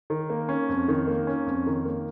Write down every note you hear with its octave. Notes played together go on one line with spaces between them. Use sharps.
D#3
A#3
C#4
F2
D#3
A#3
C#4
F2
D#3
A#3